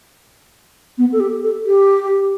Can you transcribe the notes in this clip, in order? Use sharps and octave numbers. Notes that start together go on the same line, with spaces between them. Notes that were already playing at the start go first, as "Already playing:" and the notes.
B3
A4
G4
A4
G4